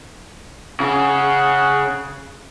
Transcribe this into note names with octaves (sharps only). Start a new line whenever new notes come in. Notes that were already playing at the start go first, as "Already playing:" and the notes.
C#3 C#4 F#5